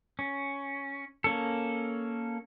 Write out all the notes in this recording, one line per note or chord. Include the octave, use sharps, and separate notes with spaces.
C#4
A#3 C#4 A4